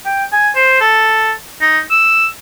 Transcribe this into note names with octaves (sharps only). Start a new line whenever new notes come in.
G5
G#5
C5
A4
D#4
E6